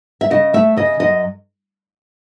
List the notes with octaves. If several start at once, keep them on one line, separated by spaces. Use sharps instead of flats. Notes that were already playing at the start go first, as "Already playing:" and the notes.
E5
C#3 D#5
A3 E5
C#3 D#5
F#2 D#5